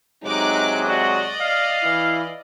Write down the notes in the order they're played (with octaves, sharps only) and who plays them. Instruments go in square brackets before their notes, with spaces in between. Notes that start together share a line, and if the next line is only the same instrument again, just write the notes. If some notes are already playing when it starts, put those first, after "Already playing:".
[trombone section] C3 F#3 G#3 [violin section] D#4 D6 F#6
[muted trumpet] F#4 [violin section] D5 D#5
[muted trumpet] F5
[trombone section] E3 E4